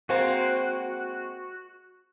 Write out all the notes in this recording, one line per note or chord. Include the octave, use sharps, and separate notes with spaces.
G#3 A#3 C4 F#4